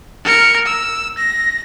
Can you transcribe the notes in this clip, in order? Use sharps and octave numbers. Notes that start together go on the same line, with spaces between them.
A#4 C#7
E6
A#6